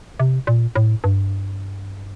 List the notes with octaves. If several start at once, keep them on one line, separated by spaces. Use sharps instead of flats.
C3
A#2
A2
G2